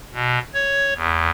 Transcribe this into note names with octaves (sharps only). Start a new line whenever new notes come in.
B2
C#5
E2